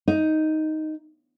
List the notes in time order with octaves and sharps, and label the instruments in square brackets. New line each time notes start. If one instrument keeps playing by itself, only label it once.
[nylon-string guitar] D#4